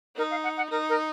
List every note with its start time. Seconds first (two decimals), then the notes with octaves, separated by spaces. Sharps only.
0.17 D#4 A#4
0.31 F5
0.43 F#5
0.57 F#5
0.70 D#4 A#4
0.89 A#4